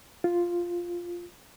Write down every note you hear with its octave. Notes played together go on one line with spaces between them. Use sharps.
F4